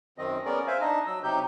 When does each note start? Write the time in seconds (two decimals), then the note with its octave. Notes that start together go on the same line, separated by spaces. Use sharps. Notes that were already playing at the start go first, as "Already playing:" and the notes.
0.18 F#2 D#3 C4 D#5
0.45 B3 C#4 G#4 A#4 D5
0.67 C5 E5 F5 G#5
0.81 D4 D#4 D#5
1.07 F#3 E6
1.23 C3 F#3 D#4 G4 G6